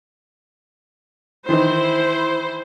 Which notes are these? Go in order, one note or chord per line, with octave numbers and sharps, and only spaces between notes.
D#3 E3 D#4 E4 C5